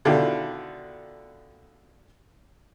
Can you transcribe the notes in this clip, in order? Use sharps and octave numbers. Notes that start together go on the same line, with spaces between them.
B2 D3 D#3 E4 F4 G4